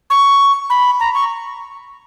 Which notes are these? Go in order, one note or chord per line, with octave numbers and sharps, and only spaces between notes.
C#6
B5
A#5
C#6